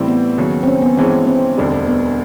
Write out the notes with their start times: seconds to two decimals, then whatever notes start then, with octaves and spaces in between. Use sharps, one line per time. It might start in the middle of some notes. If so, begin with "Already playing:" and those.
Already playing: A2 E3 G3 C4
0.08 B3
0.38 D#2 C#3 F#3
0.63 C4
0.67 C#4
0.82 B3
0.97 G2 E3 G#3 C4 C#4
1.27 C4
1.57 E1 D2 D3 G3
1.87 B3